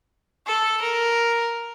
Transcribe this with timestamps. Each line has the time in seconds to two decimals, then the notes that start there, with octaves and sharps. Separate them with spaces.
0.47 A4
0.81 A#4